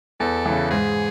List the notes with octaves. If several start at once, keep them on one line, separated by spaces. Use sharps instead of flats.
E2 A4
C#3 E3
G#2 G#4